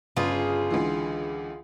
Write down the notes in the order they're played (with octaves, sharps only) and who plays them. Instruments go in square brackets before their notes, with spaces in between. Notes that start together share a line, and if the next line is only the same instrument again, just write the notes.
[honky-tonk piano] G1 C#3 [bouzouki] F4 G#4
[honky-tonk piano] C#2 D3 E3